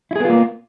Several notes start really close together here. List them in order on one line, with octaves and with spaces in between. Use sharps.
E4 G#4 B3 F4 A#3